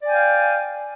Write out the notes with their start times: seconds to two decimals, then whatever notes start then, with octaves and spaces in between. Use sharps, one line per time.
0.02 D5
0.05 G#5
0.09 G5
0.12 F5